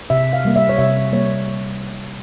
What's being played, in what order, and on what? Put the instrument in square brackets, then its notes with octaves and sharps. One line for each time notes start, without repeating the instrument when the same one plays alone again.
[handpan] C3 E5
F5
G3 A#3
E5
C#5
C3 E5
G3 A#3 C#5